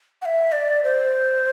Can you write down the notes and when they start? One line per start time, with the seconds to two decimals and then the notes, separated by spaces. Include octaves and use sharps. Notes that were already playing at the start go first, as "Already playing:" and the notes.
0.22 F#5
0.25 E5
0.52 D5
0.84 C5